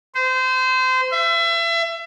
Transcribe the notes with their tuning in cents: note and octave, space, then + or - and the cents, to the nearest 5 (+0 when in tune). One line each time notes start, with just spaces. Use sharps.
C5 -25
E5 +30